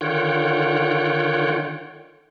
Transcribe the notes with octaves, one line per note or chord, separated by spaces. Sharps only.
D3 D#3 F4 C#5 F#5 G5